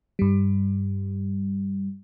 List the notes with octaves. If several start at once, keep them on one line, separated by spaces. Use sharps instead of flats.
G2 G3